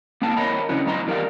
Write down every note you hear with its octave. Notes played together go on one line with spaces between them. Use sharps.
A#3 B3 F5 G5 A5
A#4 C#5 D#5 F5 A#5 B5
C#3 E3 B3 D4 F#4
F#2 B2 B3 D#5 A#5 C6
E2 G3 A#4 D5 F5